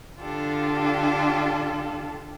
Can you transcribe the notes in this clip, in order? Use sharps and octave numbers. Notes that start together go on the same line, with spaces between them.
D3 D4 F4 G4 A4